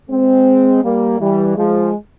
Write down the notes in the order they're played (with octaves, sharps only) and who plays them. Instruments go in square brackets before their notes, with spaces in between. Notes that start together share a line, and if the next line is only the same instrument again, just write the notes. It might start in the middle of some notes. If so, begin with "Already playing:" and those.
[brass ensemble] G#3 C4
G3 A#3
E3 G3
F3 G#3